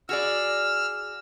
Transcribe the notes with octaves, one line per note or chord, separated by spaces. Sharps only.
F#4 G#4 D5 E6 F6